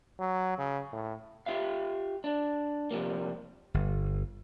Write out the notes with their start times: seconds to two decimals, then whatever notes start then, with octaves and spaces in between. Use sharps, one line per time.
0.20 F#3
0.58 C#3
0.93 A2
1.46 F4 G4 E5 F5
2.24 D4
2.91 C3 F3 G3 A#3
3.74 G1